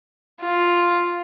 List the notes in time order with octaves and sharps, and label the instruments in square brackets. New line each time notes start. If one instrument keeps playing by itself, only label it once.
[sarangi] F4